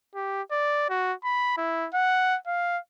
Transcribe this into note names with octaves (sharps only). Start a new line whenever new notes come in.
G4
D5
F#4
B5
E4
F#5
F5